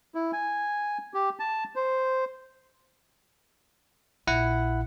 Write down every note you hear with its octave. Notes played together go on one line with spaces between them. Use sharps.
E4
G#5
G4
A5
C5
A#1 E4 F#5